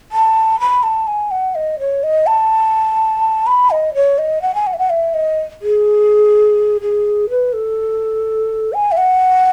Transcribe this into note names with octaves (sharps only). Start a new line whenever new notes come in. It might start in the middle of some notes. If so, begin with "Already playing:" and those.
A5
B5
A5
G#5
F#5
D#5
C#5
D#5
A5
B5
D#5
C#5
D#5
F#5
G#5
F#5
E5
F#5
E5
D#5
G#4
G#4
B4
A4
G#5
E5
F#5